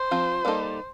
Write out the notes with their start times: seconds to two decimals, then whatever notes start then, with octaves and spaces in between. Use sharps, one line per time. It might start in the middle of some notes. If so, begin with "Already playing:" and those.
Already playing: C5
0.11 F3 C4 F4
0.45 G3 A#3 D#4 A4